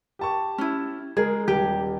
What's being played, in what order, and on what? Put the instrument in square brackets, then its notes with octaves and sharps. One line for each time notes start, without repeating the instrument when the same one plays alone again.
[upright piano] G4 A5 C#6
[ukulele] C#4 E4
[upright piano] G#3 A#4 [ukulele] G#4
[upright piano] D#1 [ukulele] G4